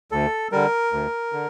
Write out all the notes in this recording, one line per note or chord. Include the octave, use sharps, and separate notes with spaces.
D2 A4
D3 G3 A#4
D2
D3